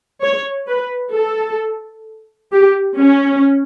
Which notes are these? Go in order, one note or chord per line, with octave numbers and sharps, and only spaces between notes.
C#5
B4
A4
G4
C#4